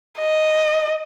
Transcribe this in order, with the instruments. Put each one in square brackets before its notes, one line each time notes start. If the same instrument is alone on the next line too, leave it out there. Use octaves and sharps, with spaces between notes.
[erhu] D#5